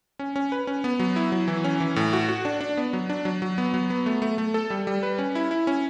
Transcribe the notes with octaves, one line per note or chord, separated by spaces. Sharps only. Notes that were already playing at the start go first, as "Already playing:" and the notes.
C#4
C#4
B4
C#4
B3
F#3
E4
F#3
E3
C#4
E3
A2
F#4
F#4
D4
D4
B3
F#3
D4
F#3
F#3
B3
F#3
B3
A3
A3
A3
A4
G3
G3
B4
C#4
E4
E4
C#4